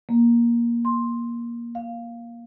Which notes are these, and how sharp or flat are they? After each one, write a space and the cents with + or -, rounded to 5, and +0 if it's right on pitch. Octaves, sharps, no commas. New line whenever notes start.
A#3 +15
C6 +10
F5 +0